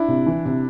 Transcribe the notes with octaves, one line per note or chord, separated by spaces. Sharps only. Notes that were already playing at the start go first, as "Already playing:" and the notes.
Already playing: D4 E4
C3
E3
C3